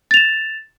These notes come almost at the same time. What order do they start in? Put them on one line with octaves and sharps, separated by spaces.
A6 F7 E7